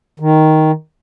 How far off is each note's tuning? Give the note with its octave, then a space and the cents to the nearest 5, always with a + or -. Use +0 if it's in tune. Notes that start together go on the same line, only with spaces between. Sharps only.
D#3 +5